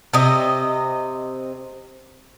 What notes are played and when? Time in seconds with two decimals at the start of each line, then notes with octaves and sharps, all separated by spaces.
0.13 C3 D#5